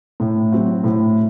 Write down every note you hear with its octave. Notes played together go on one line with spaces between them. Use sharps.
A2
F#3 C4 F#4
A2